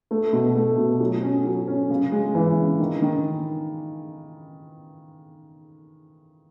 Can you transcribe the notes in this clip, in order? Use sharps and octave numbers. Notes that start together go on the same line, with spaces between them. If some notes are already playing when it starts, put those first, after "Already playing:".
A3
B2
A3
B2
F#3
C#4
F#3
C#4
C#3
G#3
E3
C#3
D#3
D#3